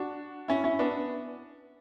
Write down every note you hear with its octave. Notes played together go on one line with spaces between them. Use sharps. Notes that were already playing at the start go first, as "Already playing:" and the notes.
Already playing: D4 F#4
C#4 E4
C#4 E4
B3 D4